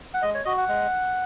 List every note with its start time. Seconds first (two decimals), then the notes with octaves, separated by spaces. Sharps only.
0.14 F#5
0.22 G#3 D#5
0.34 C#5
0.45 F#4 D#5
0.58 F#5
0.69 G#3